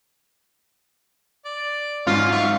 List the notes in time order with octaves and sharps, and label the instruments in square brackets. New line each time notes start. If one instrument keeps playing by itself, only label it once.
[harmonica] D5
[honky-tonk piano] G#2 [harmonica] F#3 C#4 [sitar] F4
[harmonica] E5 F5 C#6